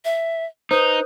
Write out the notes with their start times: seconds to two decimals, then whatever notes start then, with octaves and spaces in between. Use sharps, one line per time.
0.05 E5
0.71 D#4 B4 C5 D#6 G6